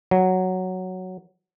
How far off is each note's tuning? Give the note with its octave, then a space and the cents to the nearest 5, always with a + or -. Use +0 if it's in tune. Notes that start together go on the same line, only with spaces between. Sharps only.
F#3 +0